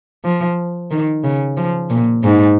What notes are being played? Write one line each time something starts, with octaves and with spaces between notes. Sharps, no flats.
F3
D#3
C#3
F3
A#2
G#2